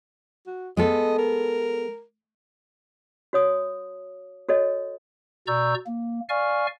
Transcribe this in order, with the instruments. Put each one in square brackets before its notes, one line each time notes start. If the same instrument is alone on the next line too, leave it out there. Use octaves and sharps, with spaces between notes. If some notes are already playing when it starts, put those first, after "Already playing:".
[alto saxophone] F#4
[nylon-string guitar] G#3 B3 A4 [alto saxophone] D#5
[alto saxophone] A#4
[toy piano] F#4 C#5 D#6
F#4 A4 C#5 D#5
[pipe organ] B2 D5 A#5 C#6 E6 G6
A#3
D5 F5 G#5 C#6 F6